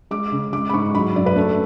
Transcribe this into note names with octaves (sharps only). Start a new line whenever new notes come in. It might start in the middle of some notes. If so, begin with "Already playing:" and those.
G#3 D6
C#3
G#3 D6
B5
G#2 C#6
F#3 B5
F#2 D5
B4
A3 A4